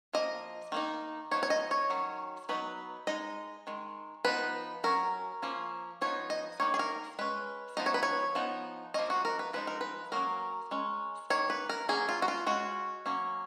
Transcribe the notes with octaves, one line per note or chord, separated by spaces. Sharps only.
F3 A#3 D#5
D#3 A#3 D#4
F3 B3 D#4 C#5
C#5
D#5
C#5
D#3 F#3 C#4
F#3 B3 D#4 B4
G#3 D#4 D#5
D#3 G#3
F3 B3 D#4 B4
F#3 C#4 A#4
F3 A#3 C#4
F3 B3 D#4 C#5
D#5
D#3 A#3 D#4 C#5
G#4
A#4
G#3 C#4 B4
F3 B3 D#4 D#5
C#5
B4
C#5
F3 B3 D#4
F3 A#3 C#4 D#5
F#4
A#4
B4
F3 G#3 D#4 B4
A#4
B4
F#3 A#3 C#4 A#4
G#3 C#4
D#3 A#3 C#5
B4
A#4
F#3 A#3 C#4 G#4
F4
F#4
F4
G#3 C#4 F#4
F#3 A#3 C#4